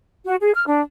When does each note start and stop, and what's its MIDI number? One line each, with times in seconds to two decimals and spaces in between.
0.25 0.35 66
0.40 0.52 68
0.54 0.64 89
0.66 0.80 62